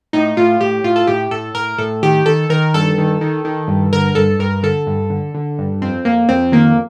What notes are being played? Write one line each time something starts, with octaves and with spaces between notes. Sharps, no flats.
A2 D#4
A2 F4
A2 G4
A2 F4
A4
A2 G4
A2 A4
A2 A#4
A2 A4
D#3 G4
D#3 A4
D#3 A#4
G2 A4
D#3
D#3
D#3
G2
D3 A#4
G2 A4
G2 A#4
D3 A4
G2
D3
D3
G2
F2 C4
F2 A#3
F2 C4
D#3 A#3